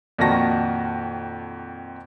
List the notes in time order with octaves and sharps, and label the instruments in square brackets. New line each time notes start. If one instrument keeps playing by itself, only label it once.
[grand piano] F2 A#2 D#3 F#4 A5 A#6